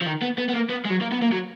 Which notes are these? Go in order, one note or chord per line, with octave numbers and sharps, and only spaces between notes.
F3
D#3
B3
B3
B3
A#3
B3
G#3
F#3
A#3
B3
A#3
F#3